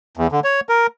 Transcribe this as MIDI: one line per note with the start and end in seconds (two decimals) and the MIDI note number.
0.17 0.27 40
0.32 0.40 50
0.44 0.60 73
0.69 0.87 70